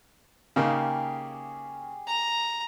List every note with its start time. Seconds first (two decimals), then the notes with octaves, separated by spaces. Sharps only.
0.56 C#3 A#3 D#4 G4 G#4
2.07 A#5